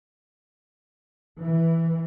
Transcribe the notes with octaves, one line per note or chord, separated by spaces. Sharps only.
E3